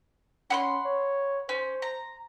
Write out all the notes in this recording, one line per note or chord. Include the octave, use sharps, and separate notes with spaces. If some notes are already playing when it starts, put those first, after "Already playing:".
C#4 F#5 B5 C6
C#5
C#4 C5
A#5